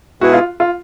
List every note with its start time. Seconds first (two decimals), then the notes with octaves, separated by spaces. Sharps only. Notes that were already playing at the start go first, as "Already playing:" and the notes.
0.21 B2 G#3 B3 E4 F#4 G#4
0.33 F4
0.60 F4